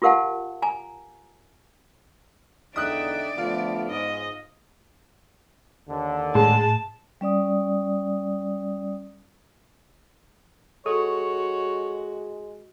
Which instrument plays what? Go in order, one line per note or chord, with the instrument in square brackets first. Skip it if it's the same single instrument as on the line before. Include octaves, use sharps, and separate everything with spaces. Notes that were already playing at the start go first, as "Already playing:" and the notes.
[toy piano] F4 G4 A#4 F5 F#5 A5
G#5 A#5
[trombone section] E2 D3 D#4 [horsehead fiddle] D5 [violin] E5 G5 [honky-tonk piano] D#6 F#6
[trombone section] D3 F3 A3 [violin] B3 [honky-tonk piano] F4
[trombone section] G#2 [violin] D#5
[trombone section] D#2 D3
[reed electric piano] A2 [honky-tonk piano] G#3 [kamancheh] A5
[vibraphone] G3 C#4 D5 D#6
[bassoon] G#3 [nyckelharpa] F#4 [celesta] A4 C#6 [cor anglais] C#5